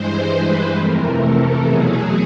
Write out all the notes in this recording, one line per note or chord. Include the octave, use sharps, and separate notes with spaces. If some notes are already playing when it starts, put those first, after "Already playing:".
Already playing: G2 E3 G#3 C5
B4
F2 C3 E3 A3 A#4
A4
E2 B2 F#3 A3 G#4